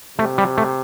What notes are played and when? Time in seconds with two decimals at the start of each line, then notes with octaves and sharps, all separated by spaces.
0.18 C3 A3
0.38 G3
0.58 A3